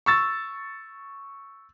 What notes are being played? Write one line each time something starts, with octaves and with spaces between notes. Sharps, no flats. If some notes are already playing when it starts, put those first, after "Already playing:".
C#6 E6 A6